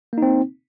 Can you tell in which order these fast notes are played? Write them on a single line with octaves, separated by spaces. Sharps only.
A#3 D#4 C4